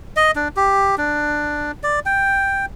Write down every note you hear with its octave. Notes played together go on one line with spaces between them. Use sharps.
D#5
D4
G4
D4
D5
G5